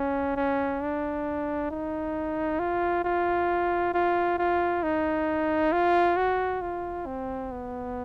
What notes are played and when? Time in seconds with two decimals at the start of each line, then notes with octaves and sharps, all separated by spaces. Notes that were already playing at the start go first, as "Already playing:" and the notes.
Already playing: C#4
0.36 C#4
0.81 D4
1.71 D#4
2.59 F4
3.05 F4
3.94 F4
4.38 F4
4.83 D#4
5.72 F4
6.17 F#4
6.61 F4
7.06 C4
7.51 B3